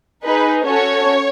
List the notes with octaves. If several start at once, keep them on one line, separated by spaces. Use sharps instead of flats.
D#4 G#4 B4
C#4 F#4 A4 C#5